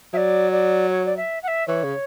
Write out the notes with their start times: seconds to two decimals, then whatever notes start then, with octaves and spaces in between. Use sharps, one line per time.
0.13 F#3 D5 E5
0.52 D5
0.90 C#5
1.05 D5
1.17 E5
1.42 F#5
1.47 E5
1.68 E3 C#5
1.84 C#3